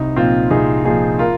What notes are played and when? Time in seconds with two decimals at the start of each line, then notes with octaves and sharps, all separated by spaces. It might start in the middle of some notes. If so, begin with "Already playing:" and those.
Already playing: C2 D#4
0.16 A#2 F3 C4 F4
0.50 C2 D#4 G#4
0.85 A#2 F3 D#4 G#4
1.19 F4 A#4